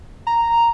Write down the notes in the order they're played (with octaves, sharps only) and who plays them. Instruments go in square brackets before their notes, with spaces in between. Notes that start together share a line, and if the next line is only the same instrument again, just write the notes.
[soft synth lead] A#5